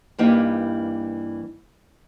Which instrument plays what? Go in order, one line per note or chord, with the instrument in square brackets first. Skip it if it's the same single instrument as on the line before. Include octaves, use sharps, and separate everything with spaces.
[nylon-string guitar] G2 E3 A#3 D#4 G4